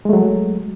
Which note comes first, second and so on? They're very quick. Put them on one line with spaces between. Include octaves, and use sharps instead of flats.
G#3 A3 F#3